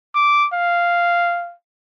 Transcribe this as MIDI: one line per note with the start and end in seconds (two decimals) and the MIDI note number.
0.15 0.48 86
0.54 1.54 77